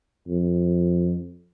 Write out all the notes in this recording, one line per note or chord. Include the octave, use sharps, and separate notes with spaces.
F2